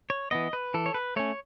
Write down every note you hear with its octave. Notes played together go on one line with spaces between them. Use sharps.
C#5
E3 B3 D#5
B4
E3 A4
C#5
B4
A3 C#4 C#5